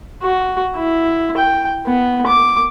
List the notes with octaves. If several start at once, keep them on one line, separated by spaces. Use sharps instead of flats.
F#4
E4
G5
B3
D6